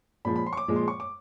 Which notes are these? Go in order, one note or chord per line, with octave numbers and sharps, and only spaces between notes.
A#2 F3 G#3 B5
B5
C6
C#6
D6
A#2 F3 G#3
C6
C#6
D6